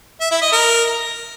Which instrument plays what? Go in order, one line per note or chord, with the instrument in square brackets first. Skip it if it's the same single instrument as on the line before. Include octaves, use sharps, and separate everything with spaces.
[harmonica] E5
E4
D#5
A#4